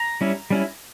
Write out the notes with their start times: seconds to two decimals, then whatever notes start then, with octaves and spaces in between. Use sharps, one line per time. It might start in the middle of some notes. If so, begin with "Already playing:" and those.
Already playing: A#5
0.21 G3 C#4 E4
0.50 G3 C#4 E4